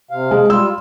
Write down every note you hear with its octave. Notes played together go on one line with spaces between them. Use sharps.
C3 F5
G#3
G3 F4 E6